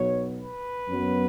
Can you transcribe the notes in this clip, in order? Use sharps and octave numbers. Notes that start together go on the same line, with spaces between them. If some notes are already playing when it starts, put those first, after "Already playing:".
Already playing: B1 B2 F#3 B3 C#5
B4
F#2 F#3 B3